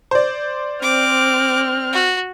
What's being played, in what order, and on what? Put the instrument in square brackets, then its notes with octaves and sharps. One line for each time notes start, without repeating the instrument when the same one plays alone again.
[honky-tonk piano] C5 D5
[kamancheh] C4 F6 [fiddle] D6
[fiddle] F#4